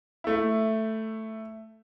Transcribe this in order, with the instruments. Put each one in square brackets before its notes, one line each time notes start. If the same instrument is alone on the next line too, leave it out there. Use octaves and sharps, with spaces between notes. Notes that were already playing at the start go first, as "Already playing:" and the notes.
[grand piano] A3 E4